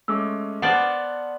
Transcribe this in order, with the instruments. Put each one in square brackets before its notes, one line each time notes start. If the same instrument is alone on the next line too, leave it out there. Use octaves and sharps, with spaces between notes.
[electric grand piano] G#3 A3 C#4 [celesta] D6 E6
[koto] B3 C5 D5 [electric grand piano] F#5 A5 F6